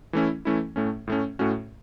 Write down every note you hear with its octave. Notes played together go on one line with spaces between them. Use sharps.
E3 A3 C#4 E4
E3 A3 C#4 E4
A2 A3 C#4
A2 A3 C#4
A2 A3 C#4 F#4